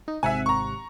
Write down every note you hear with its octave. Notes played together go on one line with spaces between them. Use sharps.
D#4
G#1 C3 E5 F#5 G#5
A#5 C#6